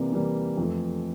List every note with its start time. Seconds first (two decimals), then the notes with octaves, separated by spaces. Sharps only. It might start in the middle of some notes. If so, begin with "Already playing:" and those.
Already playing: C3 E3 G3 A#3
0.12 C3 E3 G3 A#3
0.57 F2 E3 A3